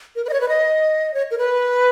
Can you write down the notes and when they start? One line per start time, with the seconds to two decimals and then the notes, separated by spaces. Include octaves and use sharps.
0.16 A#4
0.25 B4
0.29 D#5
0.33 C#5
0.41 B4
0.49 D#5
1.14 C#5
1.31 A#4
1.38 B4